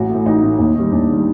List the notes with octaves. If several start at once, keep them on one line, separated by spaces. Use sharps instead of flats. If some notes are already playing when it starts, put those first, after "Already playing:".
Already playing: A1 F#4
A3
A2
A1 D#4
A2 A3
D#2
D#3 G3
D#2 D4
D#3 G3